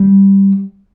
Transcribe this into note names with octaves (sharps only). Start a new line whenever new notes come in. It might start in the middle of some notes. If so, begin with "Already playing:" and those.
Already playing: G3